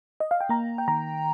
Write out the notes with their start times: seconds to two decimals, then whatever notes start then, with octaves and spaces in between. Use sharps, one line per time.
0.20 D#5
0.31 F5
0.41 G5
0.49 A#3 A#5
0.78 G5
0.88 D#3 A#5